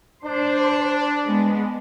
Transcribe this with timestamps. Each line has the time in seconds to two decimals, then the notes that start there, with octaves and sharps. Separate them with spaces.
0.25 D4 C5
1.27 G#3 B3